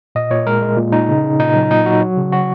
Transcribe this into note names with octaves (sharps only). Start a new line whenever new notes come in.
A#2 D#5
A#2 C#5
G#3 A#4
G#3
A#2
A#2 D#4
C#3
C#3
A#2 D#4
F#3
A#2 D#4
F#3 F#4
F#3
C#3
F#3 F#4